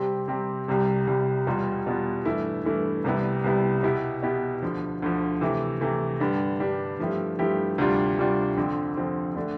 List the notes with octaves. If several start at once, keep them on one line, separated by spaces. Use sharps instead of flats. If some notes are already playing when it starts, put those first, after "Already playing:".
Already playing: C3 G3 C4 G4
C3 G3 C4 G4
C2 C3 G3
C2 C3 G3
E2 B2 G3 B3 F4
E2 B2 G3 B3 F4
G2 E3 A3 E4
G2 E3 A3 E4
C2 C3 G3 B3 E4
C2 C3 G3 B3 E4
B2 B3 E4 G4
B2 B3 E4 G4
D2 D3 F3
D2 D3 F3
C3 E3 A3 E4
C3 E3 A3 E4
G2 D3 G3 D4 G4
G2 D3 G3 D4 G4
G2 F3 A3 E4 G4
G2 F3 A3 E4 G4
D2 C3 G3 D4 F4
D2 C3 G3 D4 F4
F2 D3 F3 C4
F2 D3 F3 C4
D3 A3 D4